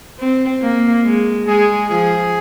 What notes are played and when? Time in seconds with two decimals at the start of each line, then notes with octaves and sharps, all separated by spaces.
0.20 C4
0.62 A#3
1.04 G#3
1.46 G#3 G#4
1.89 F3 G#4